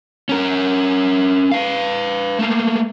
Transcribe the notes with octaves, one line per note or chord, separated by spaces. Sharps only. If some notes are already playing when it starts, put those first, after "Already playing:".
C#4 A#4
B4 F5
A3 A#3